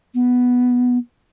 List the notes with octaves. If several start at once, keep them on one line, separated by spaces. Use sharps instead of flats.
B3